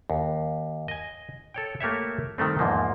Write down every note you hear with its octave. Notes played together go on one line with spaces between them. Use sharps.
D#2
D#5 G#5
A4 C#5 G5
A3 A#3 G4 C#5 E5
D#3 G3 A3 C4
E2 G#2 F3 A#3